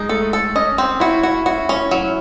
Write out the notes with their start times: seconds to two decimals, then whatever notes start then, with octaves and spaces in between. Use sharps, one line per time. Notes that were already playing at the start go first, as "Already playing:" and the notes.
Already playing: G#3 D#4
0.09 A3 A4
0.33 A4
0.55 C#4 D#5
0.78 C4
1.00 E4 F#4
1.23 F#4
1.46 F#4
1.69 C#4
1.91 F#3